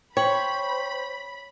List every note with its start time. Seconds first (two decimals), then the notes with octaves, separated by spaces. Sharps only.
0.17 C5 C#5 G5 B5 F#7